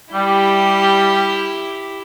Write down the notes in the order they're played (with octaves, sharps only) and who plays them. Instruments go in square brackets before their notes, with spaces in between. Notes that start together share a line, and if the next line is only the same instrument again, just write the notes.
[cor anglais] G3 [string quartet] E4 G4